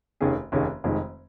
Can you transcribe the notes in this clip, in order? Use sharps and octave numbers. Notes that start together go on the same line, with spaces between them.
F1 D#2 D#3 C#4 G#4
F1 D#2 D#3 C#4 G#4
F1 F2 D#3 G#3